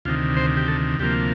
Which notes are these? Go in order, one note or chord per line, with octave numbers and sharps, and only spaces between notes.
D2 C3 D#3 F4
C5
G4
A4
D2 C3 F3 A#3 G4